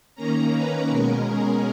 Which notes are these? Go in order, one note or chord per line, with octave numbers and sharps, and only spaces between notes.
D#3 A#3 C#4 A#5
B4
B2 G#3 C#4 A#4
G#4